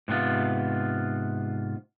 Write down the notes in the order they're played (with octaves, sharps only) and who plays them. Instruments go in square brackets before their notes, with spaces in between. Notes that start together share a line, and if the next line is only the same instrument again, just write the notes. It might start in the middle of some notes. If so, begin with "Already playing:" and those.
[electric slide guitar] G#2 C3 B3 F4